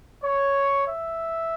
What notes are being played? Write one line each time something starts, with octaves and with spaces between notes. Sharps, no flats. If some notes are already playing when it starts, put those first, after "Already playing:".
C#5
E5